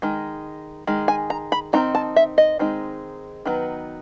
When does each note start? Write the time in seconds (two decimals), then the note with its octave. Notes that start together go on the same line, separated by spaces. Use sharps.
0.02 D#3 G#3
0.87 D#3 G#3
1.08 G#5
1.30 A#5
1.52 B5
1.73 D#3 G#3 C4 D#4 A#5
1.95 A5
2.16 E5
2.38 D#5
2.59 D#3 G#3 C4 D#4
3.45 D#3 F#3 B3 D#4